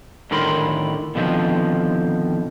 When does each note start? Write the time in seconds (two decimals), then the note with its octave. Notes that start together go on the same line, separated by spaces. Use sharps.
0.31 A2 D3 D#3 A#4 B5 C6
1.15 B2 D3 D#3 F3 C4